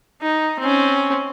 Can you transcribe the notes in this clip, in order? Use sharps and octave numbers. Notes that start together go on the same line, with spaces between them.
D#4
C4 C#4